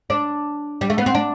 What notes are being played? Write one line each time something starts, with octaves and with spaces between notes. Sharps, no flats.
D4
G3
A3
B3
C4
D4